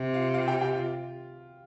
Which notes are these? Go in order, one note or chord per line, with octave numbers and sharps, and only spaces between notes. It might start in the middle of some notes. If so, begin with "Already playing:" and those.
Already playing: C3
F4 F5
F4 F5
G4 G5
G4 G5
F4